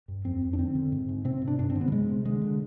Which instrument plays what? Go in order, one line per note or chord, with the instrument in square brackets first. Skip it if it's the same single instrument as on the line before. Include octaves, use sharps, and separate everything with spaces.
[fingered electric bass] G2
F2 C4
F2
D4
D3 C4
D3
G#2
G#2
C3 C4
C3
D4
G2 D4
C4
D3
B3
G3
C3 G#3
C3
D3 G#3
D3